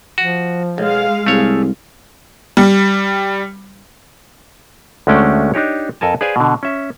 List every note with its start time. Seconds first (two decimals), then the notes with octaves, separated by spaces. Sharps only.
0.18 F3 F#4
0.78 B1 G#3 F5
1.26 C2 A3 G#4 C#5
2.57 G3
5.07 D2 G#3 A3 C#4 D4 G5
5.54 D4 D#4 G4 C#5
6.01 F2 A4 A#4 G#5 A5
6.21 G#4 B4 C5 D5 F5 G#5
6.36 B2 D3
6.63 C#4 E5